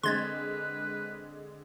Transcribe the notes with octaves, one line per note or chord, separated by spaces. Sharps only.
D3 G#3 C4 B4 C6 G#6 A6